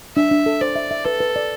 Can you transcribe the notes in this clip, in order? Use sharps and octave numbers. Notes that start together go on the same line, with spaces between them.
D4 E5
D4
A4
C5 D5
E5
E5
A4 B4
B4
D5